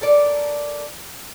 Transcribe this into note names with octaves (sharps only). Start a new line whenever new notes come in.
A4 A#4 D5